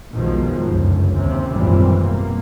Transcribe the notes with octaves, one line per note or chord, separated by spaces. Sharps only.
B1 E2 B2 D#3 F3 G#3
G1 C#2 F#2
D#2 C3 C#4
G#1 F#2 A#2 E3 G3 C4
B2 A#3